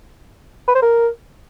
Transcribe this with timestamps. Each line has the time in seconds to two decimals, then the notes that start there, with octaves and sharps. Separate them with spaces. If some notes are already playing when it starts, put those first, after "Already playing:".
0.68 B4
0.75 C5
0.82 A#4